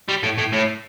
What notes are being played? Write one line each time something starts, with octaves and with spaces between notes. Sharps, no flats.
G3
A2
A2
A2